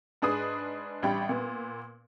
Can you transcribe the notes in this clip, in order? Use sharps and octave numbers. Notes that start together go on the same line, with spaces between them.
G#2 D4 G#4 B4 D#6
A1 G3 D4 G5 B5
A#2 B3